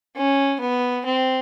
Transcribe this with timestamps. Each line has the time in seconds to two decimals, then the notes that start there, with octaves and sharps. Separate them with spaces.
0.16 C#4
0.60 B3
1.05 C4